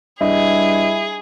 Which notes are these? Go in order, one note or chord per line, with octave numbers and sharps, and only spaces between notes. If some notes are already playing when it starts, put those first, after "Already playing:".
G2 E4 G#4 D#5